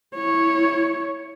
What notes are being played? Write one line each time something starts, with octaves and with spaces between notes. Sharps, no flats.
E4 C#5